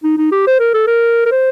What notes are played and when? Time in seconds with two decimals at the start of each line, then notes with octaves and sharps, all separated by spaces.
0.04 D#4
0.18 D#4
0.32 G4
0.47 C5
0.60 A#4
0.74 A4
0.88 A#4
1.26 A#4
1.32 C5